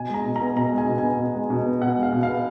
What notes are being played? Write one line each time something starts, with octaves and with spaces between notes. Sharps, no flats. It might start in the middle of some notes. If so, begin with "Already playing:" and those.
Already playing: B2 G#5
G#3 A#5
B2
A#5
B3
B2 A#5
G#3
G#5
B2
G#5
B3
B2
G#3
B2
B3
B2 F#5
G#3
F5
B2
F5
B3